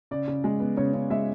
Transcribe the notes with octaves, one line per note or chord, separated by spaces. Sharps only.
C#3 D5
C#3
G#3
B3
C#3 C#5
C#3
G#3 E5